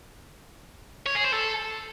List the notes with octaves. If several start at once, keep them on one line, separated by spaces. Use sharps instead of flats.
C#5
G#4
C5
A4